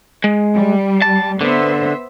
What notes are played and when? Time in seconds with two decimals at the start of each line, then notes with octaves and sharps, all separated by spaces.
0.24 G#3
0.53 G3
1.02 A5
1.41 D3 B3 C5 E5